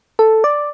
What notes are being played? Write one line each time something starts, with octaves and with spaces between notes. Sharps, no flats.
A4
D5